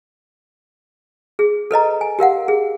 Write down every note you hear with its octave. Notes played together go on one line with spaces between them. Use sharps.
G#4
A4 B4 D#5 A#5
G#5
G4 A#4 F5 F#5
G#4